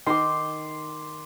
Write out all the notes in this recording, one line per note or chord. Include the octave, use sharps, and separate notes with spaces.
D#3 C6 D6